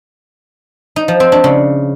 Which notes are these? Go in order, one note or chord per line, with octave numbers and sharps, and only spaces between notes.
D#4
F3
C4
D4
C#3